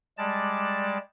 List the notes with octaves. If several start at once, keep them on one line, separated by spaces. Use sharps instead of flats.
G3 G#3 D5 A5